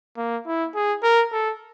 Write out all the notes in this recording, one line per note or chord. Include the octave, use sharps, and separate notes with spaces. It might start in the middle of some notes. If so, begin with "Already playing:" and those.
A#3
E4
G#4
A#4
A4